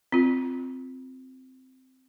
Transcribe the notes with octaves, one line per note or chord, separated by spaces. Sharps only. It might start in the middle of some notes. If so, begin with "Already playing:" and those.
C4 F4